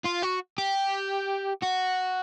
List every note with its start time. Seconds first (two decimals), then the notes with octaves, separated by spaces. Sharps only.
0.05 F4
0.23 F#4
0.58 G4
1.63 F#4